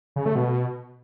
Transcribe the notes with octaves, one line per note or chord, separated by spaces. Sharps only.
C#3
A3
B2